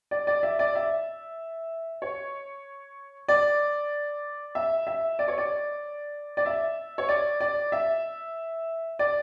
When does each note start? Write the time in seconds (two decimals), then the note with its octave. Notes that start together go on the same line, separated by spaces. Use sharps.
0.11 D5
0.27 D5
0.43 E5
0.59 D5
0.75 E5
2.02 C#5
3.28 D5
4.55 E5
4.87 E5
5.19 D5
5.28 C#5
5.38 D5
6.37 D5
6.46 E5
6.98 C#5
7.09 D5
7.41 D5
7.72 E5
8.99 D5